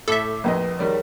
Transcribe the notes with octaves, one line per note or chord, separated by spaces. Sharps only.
A2 A4 E5 D6
A#1 F2 B4 D#5
D#3 G3 G#4 A#4 C#5 D5